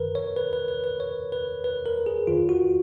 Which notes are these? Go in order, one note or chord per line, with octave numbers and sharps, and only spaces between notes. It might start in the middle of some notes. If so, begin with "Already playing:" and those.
Already playing: F#2 D#3 A#4 B4
C#5
B4
B4
B4
B4
C#5
B4
B4
A#4
G#4
F2 D#3 F4
F#4